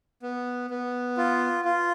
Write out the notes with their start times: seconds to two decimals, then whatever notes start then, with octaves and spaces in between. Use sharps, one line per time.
0.22 B3
0.70 B3
1.17 F4
1.65 F4